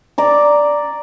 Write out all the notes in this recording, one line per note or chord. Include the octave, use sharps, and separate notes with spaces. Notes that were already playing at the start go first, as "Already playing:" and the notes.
D5 A#5 D6